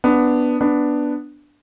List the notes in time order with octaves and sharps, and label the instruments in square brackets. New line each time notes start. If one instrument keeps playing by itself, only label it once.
[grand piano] B3 D4
B3 D4